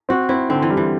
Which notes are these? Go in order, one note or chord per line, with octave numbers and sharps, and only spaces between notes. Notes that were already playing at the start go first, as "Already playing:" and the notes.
C4 F#4
C4 E4
D3 C4
E3
G3
E3